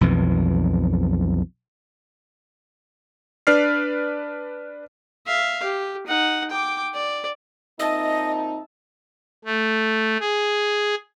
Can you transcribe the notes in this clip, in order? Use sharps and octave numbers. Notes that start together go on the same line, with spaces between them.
B1 F2 E3
D4 B4 D5 F6 C7
E5 F5
G4
D#4 F#5
G5 D6
D5
A#2 C4 D#4 D#5 E5 A5
A3
G#4